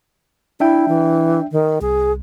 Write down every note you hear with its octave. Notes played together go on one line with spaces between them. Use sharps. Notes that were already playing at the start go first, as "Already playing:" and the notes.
D4 E4 E5 G5
E3
D#3
C2 G#4